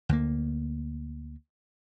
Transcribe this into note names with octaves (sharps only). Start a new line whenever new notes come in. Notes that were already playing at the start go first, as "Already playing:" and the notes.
D2 A#3